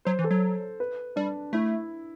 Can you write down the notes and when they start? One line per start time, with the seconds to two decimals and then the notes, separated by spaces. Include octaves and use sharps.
0.05 F#3 C5
0.19 E3
0.24 A4
0.31 F#3
0.80 B4
1.16 G3 D4
1.53 A3 E4